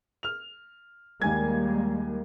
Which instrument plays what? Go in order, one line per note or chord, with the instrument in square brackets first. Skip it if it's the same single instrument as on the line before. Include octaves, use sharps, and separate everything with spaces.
[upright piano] F6 F7
[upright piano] D#2 G#5 G#6 [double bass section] G3 G#3 A#3